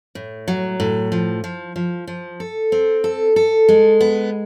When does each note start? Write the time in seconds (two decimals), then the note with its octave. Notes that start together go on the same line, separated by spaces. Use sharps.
0.15 A2
0.48 F#3
0.80 A2
1.12 F3
1.44 F3
1.76 F3
2.07 F3
2.40 A4
2.72 C4
3.04 A4
3.36 A4
3.68 G#3
4.01 B3